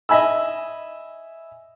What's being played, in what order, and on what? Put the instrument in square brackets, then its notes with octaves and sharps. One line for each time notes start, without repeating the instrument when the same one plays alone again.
[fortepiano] D#5 E5 G#5 B5 E6